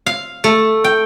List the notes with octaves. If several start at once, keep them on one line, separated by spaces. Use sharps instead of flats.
F5
A3
G5